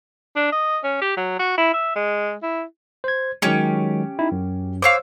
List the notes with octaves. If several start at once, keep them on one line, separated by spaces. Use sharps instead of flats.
D4
D#5
C#4
G4
F#3
F#4
E4
E5
G#3
E4
C5 G#6
D#3 F#3 G#3 C#4 G4 C#6
D#4 E4
F#2
C5 C#5 F5 C#6 D6 E6